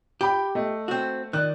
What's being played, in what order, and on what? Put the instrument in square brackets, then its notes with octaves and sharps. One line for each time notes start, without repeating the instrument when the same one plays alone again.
[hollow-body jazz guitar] G4 [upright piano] G5 B5 D6
[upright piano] A3 D#5
[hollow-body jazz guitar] C4 F#4
[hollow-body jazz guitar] D#3 [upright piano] D5 F#6